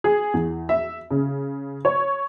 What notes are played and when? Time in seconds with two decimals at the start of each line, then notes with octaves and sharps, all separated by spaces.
0.04 G#4
0.34 E2
0.69 E5
1.11 C#3
1.85 C#5